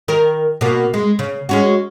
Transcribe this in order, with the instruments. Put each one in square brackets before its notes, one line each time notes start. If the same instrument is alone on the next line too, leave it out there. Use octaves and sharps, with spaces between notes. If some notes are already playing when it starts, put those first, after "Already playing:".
[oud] D#3 A#4
B2 A#3
G#3
C#3
G#3 C#4 F#4